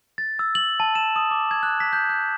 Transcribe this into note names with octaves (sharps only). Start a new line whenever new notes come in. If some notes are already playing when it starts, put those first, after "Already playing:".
A6
E6
F#7
A5
E7
D#6
D6
G#6
F#6
B6
G6
G6